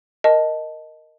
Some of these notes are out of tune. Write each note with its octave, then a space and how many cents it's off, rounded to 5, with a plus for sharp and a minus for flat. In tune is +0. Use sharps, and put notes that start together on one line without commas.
A#4 +0 D#5 +0 A5 +0